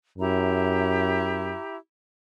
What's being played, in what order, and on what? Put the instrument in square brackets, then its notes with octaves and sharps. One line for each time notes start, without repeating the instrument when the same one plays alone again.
[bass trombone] F#2 [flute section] E4 G4 A#5